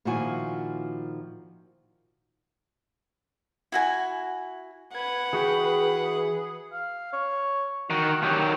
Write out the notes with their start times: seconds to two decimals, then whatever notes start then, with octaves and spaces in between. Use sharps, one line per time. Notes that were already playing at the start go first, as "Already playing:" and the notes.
0.05 A#2 D#3 F3 E4 F#4 G#5
3.72 E4 F#4 G#5
4.95 B4 F#5 G#6
5.33 E3 F#4 G#4 G5
6.73 F5
7.13 C#5
7.90 D#3 F#4
8.23 D#3 F#3 G4